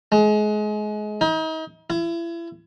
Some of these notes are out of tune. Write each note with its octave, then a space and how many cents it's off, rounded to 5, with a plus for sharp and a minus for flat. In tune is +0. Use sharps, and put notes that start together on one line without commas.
G#3 +30
D#4 +35
E4 +35